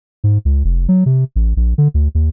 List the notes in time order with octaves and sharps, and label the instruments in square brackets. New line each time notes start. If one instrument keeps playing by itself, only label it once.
[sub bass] G#2
C#2
F1
F#3
C3
A1
A#1
D3
D2
D#2